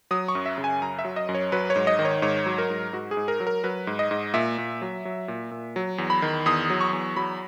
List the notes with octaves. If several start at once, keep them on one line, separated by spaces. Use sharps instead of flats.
F#3 D#6
C#6
F#2
E5
C#3
G#5
F#2 A#5
E5
F#3
D#5
F#2
C#5
F#3 B4
C#5
G#2
D#5
D#3
C#5
G#2 C#5
F#3
A#4
G#2
G#2 F#4
G#4
G#2
A#4
F#3
A#4
F#3 B4
G#2
D#5
G#2
A#2 E5
A#2
F#3
F#3
A#2
A#2
F#3
E2
B5
D#3
E2 D#6
F#3
C#6
E2
F#3 B5